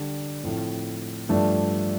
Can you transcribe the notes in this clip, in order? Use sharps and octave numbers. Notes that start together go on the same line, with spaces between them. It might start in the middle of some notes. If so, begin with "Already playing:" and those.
Already playing: D3 G3 D4
A2 F3 A3 C4
G2 F3 A3 D4